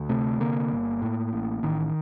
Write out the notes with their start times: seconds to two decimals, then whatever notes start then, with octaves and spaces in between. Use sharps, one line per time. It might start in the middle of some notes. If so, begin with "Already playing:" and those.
Already playing: D2
0.09 C3 A3
0.40 D3 A#3
0.71 G1
1.02 A2
1.33 A1
1.63 A1 D#3